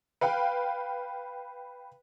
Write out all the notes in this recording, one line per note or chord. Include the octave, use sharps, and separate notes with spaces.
B4 F5 G5